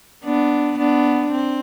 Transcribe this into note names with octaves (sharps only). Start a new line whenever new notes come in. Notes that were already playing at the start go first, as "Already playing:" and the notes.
B3 D4
B3 D4
C4